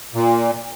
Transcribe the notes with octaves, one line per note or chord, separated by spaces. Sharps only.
A#2